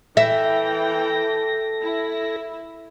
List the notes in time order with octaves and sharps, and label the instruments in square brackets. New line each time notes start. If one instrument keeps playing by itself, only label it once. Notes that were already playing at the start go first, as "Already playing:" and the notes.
[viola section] E3 G5 [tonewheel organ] A4 A#6 [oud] E5
[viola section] E4